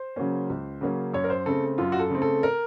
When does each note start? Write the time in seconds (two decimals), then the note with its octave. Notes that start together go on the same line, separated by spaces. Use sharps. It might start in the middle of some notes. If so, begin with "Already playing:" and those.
Already playing: C5
0.16 C#3 F#3 A#3 C#4
0.50 C#2
0.81 C#3 F#3 A#3 C#4
1.13 F#2 C#5
1.24 A#4
1.30 C5
1.46 C#3 A3 C4 A4
1.78 F#2 F4
1.92 F#4
2.00 A4
2.10 C#3 A3 C4
2.22 A4
2.43 A#4